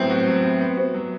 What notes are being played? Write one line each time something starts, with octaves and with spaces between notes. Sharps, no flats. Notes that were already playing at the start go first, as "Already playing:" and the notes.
Already playing: A2 F#3 B3 C4
F#4
F#3
B3
B3
F#4
F#3